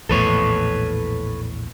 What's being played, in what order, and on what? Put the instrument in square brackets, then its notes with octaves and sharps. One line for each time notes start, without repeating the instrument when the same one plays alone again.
[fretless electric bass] A#1 E2 A2 [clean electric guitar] A4 B4 C#5